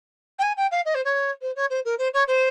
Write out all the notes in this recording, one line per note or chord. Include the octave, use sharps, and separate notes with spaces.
G5
G#5
G5
F5
D#5
C5
C#5
C5
C#5
C5
A#4
C5
C#5
C5